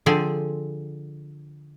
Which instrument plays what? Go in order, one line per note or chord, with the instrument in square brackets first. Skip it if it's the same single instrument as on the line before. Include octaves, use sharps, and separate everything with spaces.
[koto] D3 F3 C4 G#4 G#5